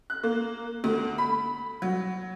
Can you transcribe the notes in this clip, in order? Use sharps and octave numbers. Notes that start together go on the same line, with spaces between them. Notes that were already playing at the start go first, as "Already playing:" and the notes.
F#6
A#3
D2
B5
F#3